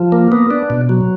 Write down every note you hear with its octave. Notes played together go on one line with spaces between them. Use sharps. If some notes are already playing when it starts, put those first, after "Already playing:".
Already playing: F3
A#3
B3
D4
B2
F#3